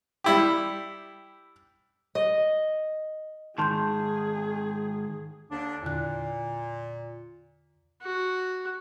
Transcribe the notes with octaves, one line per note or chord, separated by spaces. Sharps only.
G3 E4 G4
D#5
G#2 D#3 G#4 A5 C6 G6
D#2 D3 D4
E2 A#2 D3 F#6
F#4